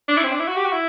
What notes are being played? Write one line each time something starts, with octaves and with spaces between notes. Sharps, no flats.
D4
E4
C4
D4
E4
F#4
G4
F#4
E4